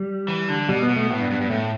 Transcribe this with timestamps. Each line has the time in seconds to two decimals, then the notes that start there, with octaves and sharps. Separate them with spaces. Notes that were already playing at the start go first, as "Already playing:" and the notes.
Already playing: G3
0.28 E3
0.48 D3
0.69 B2 G3
0.83 B3
0.89 B2
0.96 A3
1.10 A2 B3
1.20 G2
1.31 G2
1.41 G2
1.50 A2 A3